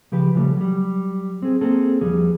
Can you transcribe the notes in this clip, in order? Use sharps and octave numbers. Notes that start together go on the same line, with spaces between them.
C#3 F3 G4 B4
C#3 E3 F3 G3 A3
F#3 G3
C4 G#4
A#3 C4 G#4 A4
E2 F3 G3 G#4